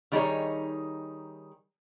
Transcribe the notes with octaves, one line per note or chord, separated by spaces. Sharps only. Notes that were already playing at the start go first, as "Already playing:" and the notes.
D#3 G3 D#4 G#4 A4 C#5